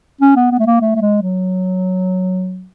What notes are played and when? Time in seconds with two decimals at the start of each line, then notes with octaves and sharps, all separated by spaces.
0.21 C#4
0.36 B3
0.51 B3
0.59 A3
0.66 A#3
0.81 A3
0.96 A3
1.02 G#3
1.22 F#3